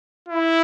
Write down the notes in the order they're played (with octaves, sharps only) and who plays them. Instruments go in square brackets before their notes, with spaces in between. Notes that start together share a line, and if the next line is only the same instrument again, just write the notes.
[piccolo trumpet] E4